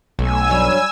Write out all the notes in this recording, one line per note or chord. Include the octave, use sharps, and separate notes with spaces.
B1 A3 G#5 E6
G2 F#3 G3 C#5